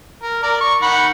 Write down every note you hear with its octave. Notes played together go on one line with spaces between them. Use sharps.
A#4
A#4 D5
C#6
D#3 F#5 B5